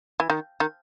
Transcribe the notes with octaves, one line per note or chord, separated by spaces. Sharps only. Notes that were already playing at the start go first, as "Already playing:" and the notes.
E3
D#3
D#3